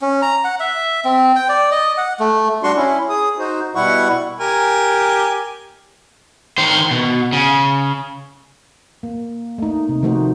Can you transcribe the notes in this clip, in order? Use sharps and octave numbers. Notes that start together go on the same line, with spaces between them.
C#4
A#5
F#5
E5
C4
G5
D5
D#5
F#5
A3
G3 D4 F#4 C6 C#6
C#4 E4
G#4 D#6
D#4 F#4 C5
B2 G3 E4 F#5 C#6
G4 A#4 G#5
D#3 C5
B2
C#3
A#3
A3 D#4
C3
D#3 F3 A3 D#4 F#4 C5